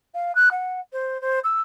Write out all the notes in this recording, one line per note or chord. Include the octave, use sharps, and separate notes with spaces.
F5
F#6
F#5
C5
C5
E6